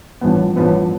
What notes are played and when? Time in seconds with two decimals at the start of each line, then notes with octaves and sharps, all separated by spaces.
0.21 A1 G2 F3 B3
0.56 A1 G2 F3 B3